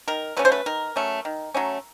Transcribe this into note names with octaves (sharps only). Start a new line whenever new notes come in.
D#3 A#4
F#3 A3 C#4 B4
C5
B4
D#3 A#4
F#3 A3 C#4
D#3
F#3 A3 C#4